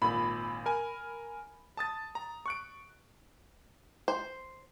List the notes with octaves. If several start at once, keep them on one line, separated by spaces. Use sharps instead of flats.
G#1 A#2 B5
A#4 G#5
A5 D#6 A6
A#5
C#6 F#6 D7
C5